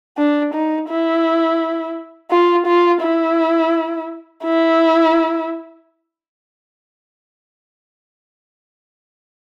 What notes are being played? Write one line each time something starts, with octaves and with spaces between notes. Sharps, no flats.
D4
D#4
E4
F4
F4
E4
E4